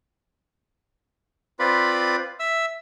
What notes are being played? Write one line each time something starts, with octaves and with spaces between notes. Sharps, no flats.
C4 F4 B4 D5 B5
E5 E6